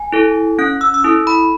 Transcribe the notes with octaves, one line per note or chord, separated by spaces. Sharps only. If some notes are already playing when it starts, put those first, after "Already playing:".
Already playing: G#5
E4 A4
C#4 F#6
E6
E6
E4 A4 D#6
B5